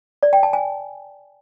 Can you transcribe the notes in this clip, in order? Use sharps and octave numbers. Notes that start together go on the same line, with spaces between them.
D5
G5
A5
G#5